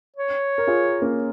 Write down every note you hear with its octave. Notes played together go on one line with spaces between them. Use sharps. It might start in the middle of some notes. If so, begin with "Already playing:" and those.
C#5
A#4
F4 G#4
A#3 C#4